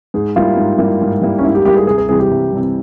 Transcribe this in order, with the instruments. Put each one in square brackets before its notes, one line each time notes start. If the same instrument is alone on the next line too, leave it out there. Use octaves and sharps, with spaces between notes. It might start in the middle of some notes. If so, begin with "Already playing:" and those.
[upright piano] G#2 [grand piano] G#4
[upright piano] G3 A#3 E4 [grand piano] F4
[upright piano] G#2
G3 A#3 E4
G#2
G3 A#3 E4
[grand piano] C#4
[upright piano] G#2 [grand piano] E4
[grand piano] G4
[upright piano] G3 A#3 E4 [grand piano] G4
[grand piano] G#4
[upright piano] C2 [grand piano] G#4
[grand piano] G#4
[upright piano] C3 E3 G3 [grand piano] G#4
[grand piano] G4
[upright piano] C2
C3 E3 G3